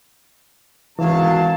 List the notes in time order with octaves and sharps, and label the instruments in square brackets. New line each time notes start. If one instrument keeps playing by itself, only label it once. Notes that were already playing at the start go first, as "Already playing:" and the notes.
[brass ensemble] G#1 C#3 A5 [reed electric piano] E3 [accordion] F#3 [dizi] F5